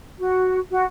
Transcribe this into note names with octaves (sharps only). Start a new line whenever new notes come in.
F#4
F#4